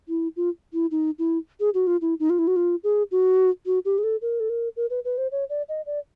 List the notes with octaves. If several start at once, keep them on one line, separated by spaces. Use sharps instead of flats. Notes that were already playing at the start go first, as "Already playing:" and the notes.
E4
F4
E4
D#4
E4
G#4
F#4
F4
E4
D#4
F4
E4
F#4
F4
G#4
F#4
F#4
G4
G#4
A4
A#4
A4
A#4
A#4
B4
B4
C5
C#5
D5
D#5
D5